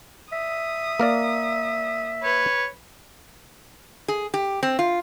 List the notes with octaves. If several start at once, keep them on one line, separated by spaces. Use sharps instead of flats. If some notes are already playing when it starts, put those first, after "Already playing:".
E5 D#6
A#3 A#4 D5
B4 C#5
G#4
G4
C4
F4